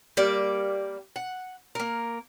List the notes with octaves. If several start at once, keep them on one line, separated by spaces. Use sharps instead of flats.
G3 A#3 D5
F#5
A#3 A#4